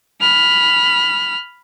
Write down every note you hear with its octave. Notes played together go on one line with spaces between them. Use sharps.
B5 F6